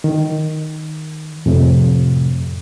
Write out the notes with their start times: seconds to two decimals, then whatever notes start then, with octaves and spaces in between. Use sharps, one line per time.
0.04 D#3
1.46 F2 A2 C3